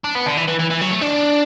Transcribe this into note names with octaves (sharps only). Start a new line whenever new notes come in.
D4
B3
D3
E3
E3
E3
E3
F#3
A3
D4